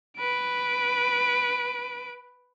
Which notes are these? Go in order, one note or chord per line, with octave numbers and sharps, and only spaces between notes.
B4 D7